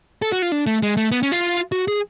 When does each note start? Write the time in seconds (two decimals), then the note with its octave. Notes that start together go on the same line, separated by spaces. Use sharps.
0.22 A4
0.32 F#4
0.42 F4
0.52 D4
0.67 A3
0.83 G#3
0.97 A3
1.12 B3
1.23 C#4
1.32 F4
1.72 F#4
1.88 G#4